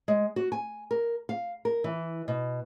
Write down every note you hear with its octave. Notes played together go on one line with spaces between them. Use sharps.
G#3
F#4
G#5
A#4
F5
A#4
E3
B2